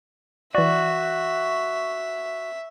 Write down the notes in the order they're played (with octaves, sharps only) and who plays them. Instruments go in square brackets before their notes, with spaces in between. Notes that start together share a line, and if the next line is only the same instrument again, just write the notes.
[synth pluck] E3 D5 [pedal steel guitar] F#4 [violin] E5